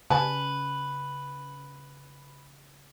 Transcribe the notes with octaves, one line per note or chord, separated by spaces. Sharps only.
C#3 B4 D5 G#5 A5